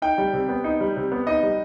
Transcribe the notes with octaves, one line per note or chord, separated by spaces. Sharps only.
D#4 G5
G3
C3
B3
D#4
G3
C3
B3
D#4 D#5
G3